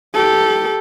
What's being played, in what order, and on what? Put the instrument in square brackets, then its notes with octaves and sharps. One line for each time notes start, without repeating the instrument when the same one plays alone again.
[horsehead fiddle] G4 A4